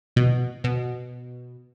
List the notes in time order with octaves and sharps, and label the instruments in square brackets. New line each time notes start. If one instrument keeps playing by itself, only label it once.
[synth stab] B2
B2